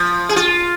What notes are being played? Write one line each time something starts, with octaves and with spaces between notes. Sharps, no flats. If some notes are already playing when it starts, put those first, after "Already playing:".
Already playing: F3
G#4
F4